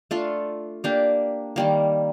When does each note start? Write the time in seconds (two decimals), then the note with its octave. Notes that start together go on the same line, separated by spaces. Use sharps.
0.11 A3 D4 F4 A4
0.84 A#3 D4 G4
1.56 D#3 G3 A#3